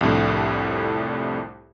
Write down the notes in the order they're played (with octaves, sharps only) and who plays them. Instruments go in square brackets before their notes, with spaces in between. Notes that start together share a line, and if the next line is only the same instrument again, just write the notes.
[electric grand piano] C2 F2 A2 D3